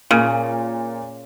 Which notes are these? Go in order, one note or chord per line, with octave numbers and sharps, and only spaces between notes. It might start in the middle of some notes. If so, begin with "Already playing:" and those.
A#2 C#3